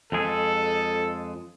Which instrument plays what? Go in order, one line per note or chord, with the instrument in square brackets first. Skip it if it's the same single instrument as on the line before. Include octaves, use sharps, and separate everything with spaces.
[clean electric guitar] F2 G#3 G#4 [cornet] A4